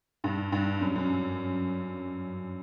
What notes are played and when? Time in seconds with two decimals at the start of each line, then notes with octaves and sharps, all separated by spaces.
0.24 G2
0.52 G2
0.81 F#2
0.96 F#2